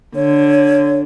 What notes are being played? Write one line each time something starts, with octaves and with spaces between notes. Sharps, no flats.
D3 C#5